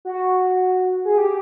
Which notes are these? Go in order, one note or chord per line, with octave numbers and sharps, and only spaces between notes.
F#4
G#4
G4